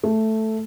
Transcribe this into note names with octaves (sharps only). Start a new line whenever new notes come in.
A3